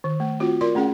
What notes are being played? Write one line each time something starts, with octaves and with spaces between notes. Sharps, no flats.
D#3
A3
C4 F4 F#4
F4 A#4 D5 C6
A3 C#4 G#4 F#5